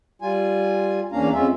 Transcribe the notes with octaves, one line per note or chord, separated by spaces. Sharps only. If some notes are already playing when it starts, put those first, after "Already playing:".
G3 F4 G#5
E2 A#3 C#4 D4 F5 A#5
F2 G#3 C#4 F4 E5